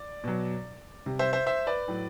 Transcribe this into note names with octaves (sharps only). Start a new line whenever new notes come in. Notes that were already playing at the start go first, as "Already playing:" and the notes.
Already playing: D5
B2 F#3
C3 G3
C5 E5
C5 E5
C5 E5
B4 D5
A2 F#3